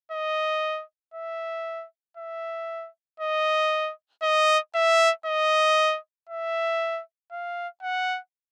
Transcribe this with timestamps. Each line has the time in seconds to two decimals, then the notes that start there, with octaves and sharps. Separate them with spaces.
0.11 D#5
1.14 E5
2.17 E5
3.20 D#5
4.22 D#5
4.75 E5
5.26 D#5
6.29 E5
7.32 F5
7.82 F#5